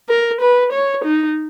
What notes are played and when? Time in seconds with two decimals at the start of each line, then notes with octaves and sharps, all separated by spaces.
0.09 A#4
0.41 B4
0.73 C#5
1.04 D#4